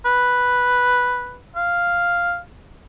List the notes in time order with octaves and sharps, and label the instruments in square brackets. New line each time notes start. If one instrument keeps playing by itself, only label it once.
[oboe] B4
F5